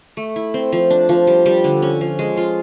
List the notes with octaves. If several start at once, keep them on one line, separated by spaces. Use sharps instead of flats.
A3
E4
C4
F3
D4
F3
G3
G3
D3
C#4
F3
G#3
F4